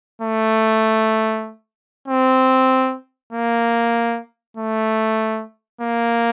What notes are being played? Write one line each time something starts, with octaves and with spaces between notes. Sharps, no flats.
A3
C4
A#3
A3
A#3